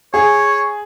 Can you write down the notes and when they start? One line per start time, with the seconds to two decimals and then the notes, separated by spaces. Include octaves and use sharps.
0.14 G#4 C#5